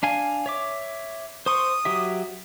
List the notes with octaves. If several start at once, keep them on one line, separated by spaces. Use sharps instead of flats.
D4 F5 G#5
C#5 E5 D6
C5 C6 C#6 D#6
F#3 G4 E5